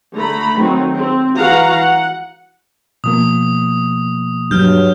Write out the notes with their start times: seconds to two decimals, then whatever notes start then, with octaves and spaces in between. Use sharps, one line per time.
0.14 D3 A3 A#5 B5
0.59 D#3 F#3 A3 C4 D#4
0.95 C4
1.37 E3 F#4 F5 F#5 A#5
1.77 F#5
3.04 B2 F3 A#3 D#6
4.51 G2 F#3 F6 G6